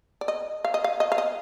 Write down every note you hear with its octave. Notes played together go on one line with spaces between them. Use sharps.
D5
D#5
F5
D#5
F5
D#5
F5
D#5